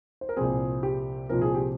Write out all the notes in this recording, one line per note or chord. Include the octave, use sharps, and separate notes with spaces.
C5
A#4
C2 A#2 F3 C4 G#4
G4
C2 A#2 F3 C4 A#4
G#4
G4